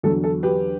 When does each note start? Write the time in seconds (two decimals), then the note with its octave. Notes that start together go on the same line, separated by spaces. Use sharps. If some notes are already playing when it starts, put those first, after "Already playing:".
0.03 E2 D3 F#3 A4
0.24 A4
0.43 G4 B4